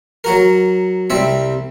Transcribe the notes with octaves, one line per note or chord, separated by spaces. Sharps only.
F#3 F#4 A#4
C2 G3 C4 E5